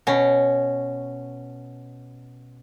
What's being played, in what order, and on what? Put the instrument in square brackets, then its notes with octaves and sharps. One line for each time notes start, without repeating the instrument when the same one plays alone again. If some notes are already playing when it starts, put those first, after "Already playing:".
[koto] B2 C#4